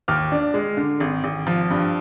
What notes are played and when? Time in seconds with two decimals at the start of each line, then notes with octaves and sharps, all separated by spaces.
0.08 D#2 D6 F6
0.32 D4
0.54 G#3
0.77 D3
1.00 G#1
1.24 G#1
1.47 F3
1.71 G2